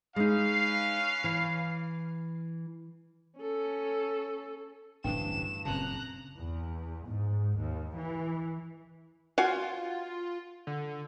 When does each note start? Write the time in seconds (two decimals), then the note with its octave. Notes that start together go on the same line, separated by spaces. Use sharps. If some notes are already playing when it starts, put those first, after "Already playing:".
0.16 G#3 C#4 D#4 B4 F5
1.24 E3
3.40 C#4 A4
5.04 D1 A1 G2 D4 G5 E7
5.65 F#1 A#2 C#3 C4 C#4 A5 A#5 F#6
6.36 E2
7.07 G#2
7.56 D#2
7.96 E3
9.38 F4 F#4 F5 G#5
10.67 D3